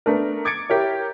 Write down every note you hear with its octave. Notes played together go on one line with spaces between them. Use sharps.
A3 B3 D4 A#4
D6 G#6 A6 C#7 D7
E4 G4 A#4 C#5